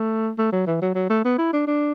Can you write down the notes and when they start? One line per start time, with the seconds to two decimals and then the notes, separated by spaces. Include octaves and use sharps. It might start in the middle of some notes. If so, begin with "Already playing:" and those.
Already playing: A3
0.38 A3
0.52 F#3
0.67 E3
0.82 F#3
0.95 F#3
1.10 A3
1.25 B3
1.38 E4
1.53 D4
1.67 D4